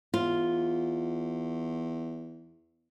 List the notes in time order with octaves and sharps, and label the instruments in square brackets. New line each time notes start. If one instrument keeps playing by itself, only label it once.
[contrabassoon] E2 [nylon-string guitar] F4